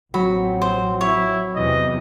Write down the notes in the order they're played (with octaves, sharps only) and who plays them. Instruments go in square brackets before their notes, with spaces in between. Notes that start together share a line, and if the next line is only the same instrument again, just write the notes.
[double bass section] A1 F3 C4 [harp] F#3 [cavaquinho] B5
[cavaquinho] C5
[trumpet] E4 [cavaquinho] C#5
[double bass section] E2 C3 E3 [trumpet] D#5